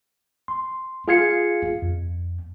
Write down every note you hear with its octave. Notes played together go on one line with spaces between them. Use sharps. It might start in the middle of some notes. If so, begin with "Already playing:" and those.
C6
F4 G#4 F5 G#6 C7 C#7
F2